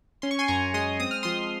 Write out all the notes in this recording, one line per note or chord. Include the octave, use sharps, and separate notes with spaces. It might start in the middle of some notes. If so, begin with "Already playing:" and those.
C#4 C6
C#6
G#5 C6
F#2 A#5 C#6
G#3 C6 D#6
C4 D#6
F6
F3 C6 D#6